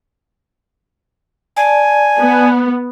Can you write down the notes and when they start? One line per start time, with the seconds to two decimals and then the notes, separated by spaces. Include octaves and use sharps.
1.57 D5 G#5 A5
2.20 B3